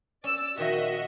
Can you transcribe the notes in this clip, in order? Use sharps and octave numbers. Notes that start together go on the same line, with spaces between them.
C#4 D5 E6
A#2 D#3 F3 F#4 D#5 E5